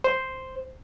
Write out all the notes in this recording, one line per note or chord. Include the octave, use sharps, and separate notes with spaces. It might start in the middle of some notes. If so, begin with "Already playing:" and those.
C5